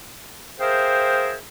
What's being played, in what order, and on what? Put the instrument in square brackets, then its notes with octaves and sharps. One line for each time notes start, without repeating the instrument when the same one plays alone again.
[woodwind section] G#4 A#4 C5 E5 F5 G5